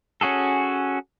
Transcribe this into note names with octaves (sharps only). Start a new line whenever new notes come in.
C#4 F#4 G#4 A4